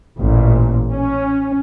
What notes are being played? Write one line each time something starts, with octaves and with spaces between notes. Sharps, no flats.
A1 A#2
C#4